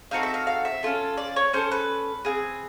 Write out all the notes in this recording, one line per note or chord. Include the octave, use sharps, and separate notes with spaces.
C4 D#4 F#4 A4 F5
E5
F5
F5
E5
C#4 F4 A4
D5
C#5
C#4 F#4 A4 C5
B4
C4 F4 G#4